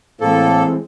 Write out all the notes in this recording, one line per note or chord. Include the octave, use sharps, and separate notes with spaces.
A2 E3 G#3 A#3 C4 A4